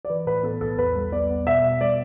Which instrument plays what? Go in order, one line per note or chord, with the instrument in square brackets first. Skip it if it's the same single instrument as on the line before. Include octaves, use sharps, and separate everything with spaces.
[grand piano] D5
[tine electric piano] E3 [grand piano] B4
[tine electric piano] A2 [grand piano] B4
[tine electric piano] B3 [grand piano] A4
[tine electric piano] B1 [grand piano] A4
[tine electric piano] E2 [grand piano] B4
[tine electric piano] G3
[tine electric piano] B3 [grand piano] D5
[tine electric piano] B3
[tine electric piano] B2 [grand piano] E5
[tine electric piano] B2
[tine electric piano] G3 [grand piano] D5